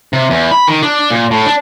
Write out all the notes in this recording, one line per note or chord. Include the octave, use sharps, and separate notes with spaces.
C3
E2
B5
D#3
D4
A#2
A2
D4